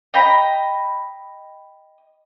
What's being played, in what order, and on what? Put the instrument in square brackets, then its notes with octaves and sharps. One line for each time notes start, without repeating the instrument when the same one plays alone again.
[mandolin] D#5 G5 A#5 B5